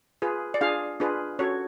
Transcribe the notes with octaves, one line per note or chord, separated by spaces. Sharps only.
F4 G#4 B4
D5
D4 F4 G#4 F5
D4 F4 G#4 B4
C#4 F#4 A4 C#5